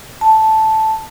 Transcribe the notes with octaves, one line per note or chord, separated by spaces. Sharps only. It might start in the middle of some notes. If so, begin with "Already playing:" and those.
A5